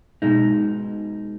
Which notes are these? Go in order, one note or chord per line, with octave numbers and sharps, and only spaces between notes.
B2 G#3 D#4